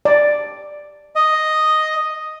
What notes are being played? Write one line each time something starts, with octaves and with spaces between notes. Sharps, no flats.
D5
D#5